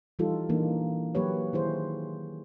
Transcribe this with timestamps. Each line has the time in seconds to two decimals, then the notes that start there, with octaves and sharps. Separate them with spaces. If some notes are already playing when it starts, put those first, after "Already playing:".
0.19 E3 G3 D#4 F4 G4 A4
0.49 E3 A#3 D4 D#4
1.15 F#3 A#3 G4 B4 C#5
1.53 D#3 E4 G#4 C5